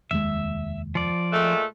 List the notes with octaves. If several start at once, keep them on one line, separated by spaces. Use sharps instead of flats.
F1 D#2 G#3 E5
F3 D5
A#2 G#3 A3